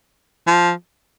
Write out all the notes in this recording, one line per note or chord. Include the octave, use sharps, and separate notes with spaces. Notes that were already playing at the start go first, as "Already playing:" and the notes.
F3